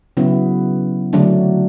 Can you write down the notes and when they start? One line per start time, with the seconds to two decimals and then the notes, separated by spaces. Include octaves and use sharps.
0.17 C#3 F#3 B3 E4
1.13 D3 F#3 A3 D4